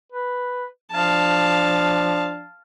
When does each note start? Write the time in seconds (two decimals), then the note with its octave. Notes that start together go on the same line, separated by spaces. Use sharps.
0.12 B4
0.92 F3 D4 F5 A5